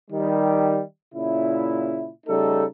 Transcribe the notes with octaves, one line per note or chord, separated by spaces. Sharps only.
D#3 G3
A#2 C#3 E4
C#3 G3 A3 D#4 A4